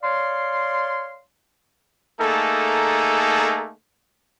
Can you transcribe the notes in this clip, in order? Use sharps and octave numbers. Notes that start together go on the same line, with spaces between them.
C#5 D5 F5 C6
A3 A#3 D#4 G#4 A4